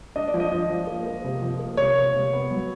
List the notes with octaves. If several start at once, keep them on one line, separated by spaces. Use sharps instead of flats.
D4 D#5
D5
F3
D#5
F3
F3
A#3
A#3
C3
F3
A#3
C3 C#5
A#3
C3
B3
F#3